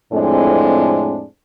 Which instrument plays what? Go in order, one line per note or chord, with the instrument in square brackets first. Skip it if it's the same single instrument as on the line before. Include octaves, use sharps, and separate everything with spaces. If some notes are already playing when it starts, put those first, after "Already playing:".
[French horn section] F2 A2 G#3 C4 D4